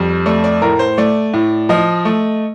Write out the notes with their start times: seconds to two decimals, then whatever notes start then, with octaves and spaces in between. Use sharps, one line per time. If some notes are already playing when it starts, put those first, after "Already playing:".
Already playing: F2 G3
0.26 A3 D5
0.44 D5
0.62 A2 A#4
0.79 C5
0.98 A3 D5
1.34 A2
1.69 F3 D#5
2.05 A3